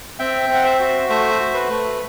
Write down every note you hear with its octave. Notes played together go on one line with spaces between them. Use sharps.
C4 E5 G5
C4
F#5
C5 E5
F#4
A3 C5 E5
F#4
B4
A3